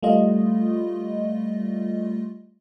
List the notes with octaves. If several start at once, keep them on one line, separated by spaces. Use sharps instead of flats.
G3 A3 F4 D#5